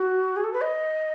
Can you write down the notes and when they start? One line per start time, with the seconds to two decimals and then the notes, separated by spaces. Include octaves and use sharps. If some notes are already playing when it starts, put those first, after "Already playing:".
Already playing: F#4
0.37 G#4
0.44 A4
0.53 B4
0.61 D#5